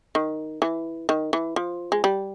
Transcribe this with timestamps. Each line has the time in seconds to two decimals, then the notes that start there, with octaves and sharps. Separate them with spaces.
0.15 D#3
0.62 E3
1.09 D#3
1.33 E3
1.56 F3
1.92 G#3
2.04 G3